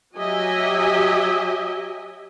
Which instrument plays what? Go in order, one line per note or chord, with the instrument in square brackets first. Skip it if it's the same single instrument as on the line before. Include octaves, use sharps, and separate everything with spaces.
[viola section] F#3 G4 D#5 E5 G#5